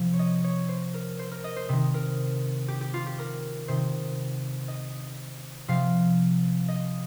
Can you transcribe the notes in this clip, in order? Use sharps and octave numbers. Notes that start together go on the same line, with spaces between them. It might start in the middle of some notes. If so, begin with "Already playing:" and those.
Already playing: C3 F3
C#5
D#5
C#5
C5
A#4
C5
A#4
D#5
C5
C3 D#3
A#4
G4
G4
F4
G4
A#4
C3 D#3 C5
D#5
C3 F3 F5
D#5